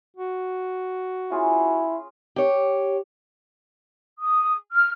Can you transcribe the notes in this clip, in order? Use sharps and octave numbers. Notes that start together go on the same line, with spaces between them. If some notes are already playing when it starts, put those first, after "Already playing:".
F#4
C#4 E4 F4 G#4
G4 C#5
D#6
F6